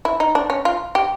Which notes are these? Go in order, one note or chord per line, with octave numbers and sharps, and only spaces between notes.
E4
D#4
D4
C#4
F4
G4